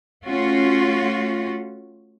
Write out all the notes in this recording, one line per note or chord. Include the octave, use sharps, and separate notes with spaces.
A3 C#4 F4 F#4